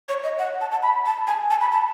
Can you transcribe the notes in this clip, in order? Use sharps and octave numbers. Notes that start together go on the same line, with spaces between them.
C#5
D#5
F#5
A5
A5
B5
A5
G#5
A5
B5
A5